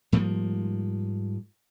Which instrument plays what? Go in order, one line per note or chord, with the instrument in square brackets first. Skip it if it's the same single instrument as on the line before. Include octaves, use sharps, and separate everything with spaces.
[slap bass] G#2 F3 G3 A#3